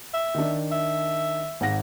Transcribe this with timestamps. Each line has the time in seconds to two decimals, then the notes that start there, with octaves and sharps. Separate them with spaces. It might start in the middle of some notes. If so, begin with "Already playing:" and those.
0.14 E5
0.35 D#3 D4
0.72 E5
1.61 G#1 F#5 A#6